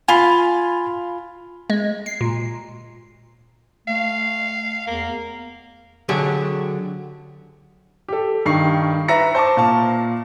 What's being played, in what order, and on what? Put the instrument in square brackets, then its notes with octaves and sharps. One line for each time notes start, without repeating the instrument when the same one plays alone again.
[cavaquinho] F4 [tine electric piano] G#5 B5
[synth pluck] G#3
C7
A#2
[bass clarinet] A3 [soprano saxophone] F5
[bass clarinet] E2 [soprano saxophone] A#3
[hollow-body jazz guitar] D3 F#3 D4 G4 G#4
[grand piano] G4 A4
G2 D#3 C#6 C7
B4 E5 A#5 A#6 C#7
C5 A5 C#6 D6
A#2 F5 A5